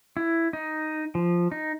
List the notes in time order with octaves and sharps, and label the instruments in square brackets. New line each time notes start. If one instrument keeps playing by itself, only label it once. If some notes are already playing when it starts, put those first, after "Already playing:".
[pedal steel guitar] E4
D#4
F3
D#4